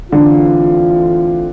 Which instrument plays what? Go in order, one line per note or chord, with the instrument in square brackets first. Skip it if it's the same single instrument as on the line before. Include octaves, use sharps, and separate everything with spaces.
[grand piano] D3 [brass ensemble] E3 A3 C4 F4